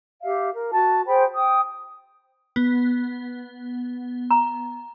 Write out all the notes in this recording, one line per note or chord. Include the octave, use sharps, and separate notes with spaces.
G4 E5 F5
A#4
F#4 A5
G#4 C5 G5 B5
G5 D#6
B3
A#5